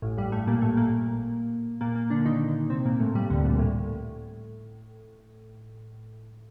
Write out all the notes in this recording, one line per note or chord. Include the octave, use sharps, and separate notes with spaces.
A1 A2
G2 G3
A2 A3
A#2 A#3
A2 A3
A#2 A#3
A#2 A#3
A#2 A#3
D3 D4
D#3 D#4
C3 C4
A#2 A#3
A2 A3
G2 G3
D2 D3
A#1 A#2
A2